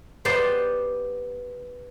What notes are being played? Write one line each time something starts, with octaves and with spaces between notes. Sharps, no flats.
B3 G4 C5 D5 G5